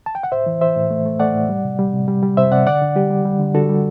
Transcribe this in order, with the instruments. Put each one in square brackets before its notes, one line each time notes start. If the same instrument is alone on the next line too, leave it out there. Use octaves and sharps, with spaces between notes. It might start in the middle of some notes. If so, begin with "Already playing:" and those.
[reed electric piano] A5
G5
F#5
A2 C5 E5
E3
E3 C5 E5
A2
A3
A3
A3 D5 F#5
A2
G3
C3
G3
C3
G3
G3
C3 C5 E5
C3 D5 F#5
D3 D5 F#5
D3
G3 G4
G3
G3
D3
D3 F#4 A4
G3